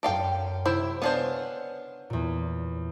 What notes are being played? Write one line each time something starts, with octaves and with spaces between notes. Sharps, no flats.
F#2 A4 F5 G5 D7
C3 E4 C5 G5 E6
B3 D4 C5 C#5 F5 G#5
E2 A#2